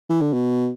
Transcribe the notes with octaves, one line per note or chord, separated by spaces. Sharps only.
E3
D3
B2